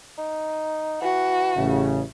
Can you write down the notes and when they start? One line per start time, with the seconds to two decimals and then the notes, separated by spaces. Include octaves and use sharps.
0.18 D#4
1.02 E3 F#4
1.56 A1 C#3 A3